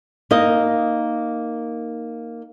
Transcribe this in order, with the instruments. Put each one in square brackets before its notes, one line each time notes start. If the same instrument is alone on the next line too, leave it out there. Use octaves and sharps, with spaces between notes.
[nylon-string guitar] A#3 D#4 D#5